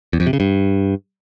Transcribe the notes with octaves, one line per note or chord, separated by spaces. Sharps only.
E2
F2
C3
C#3
G2